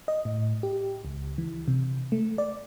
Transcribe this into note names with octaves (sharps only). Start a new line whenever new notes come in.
D#5
A2
G4
C#2
E3
C3
A3
D5